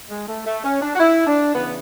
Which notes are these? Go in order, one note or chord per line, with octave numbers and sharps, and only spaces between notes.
G#3
A3
A3
C#4
D4
F#4
E4
D4
C#3 E3 B3